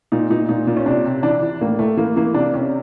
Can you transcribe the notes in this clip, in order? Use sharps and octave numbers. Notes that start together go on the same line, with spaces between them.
A#2 D#4
A#2 D#4
A#2 D#4
A#2
C#4
C3 D4
C3
E3 D4
E3
A2 A#3
A2 A3
E3 A#3
E3 A#3
C3 D4
C3 C#4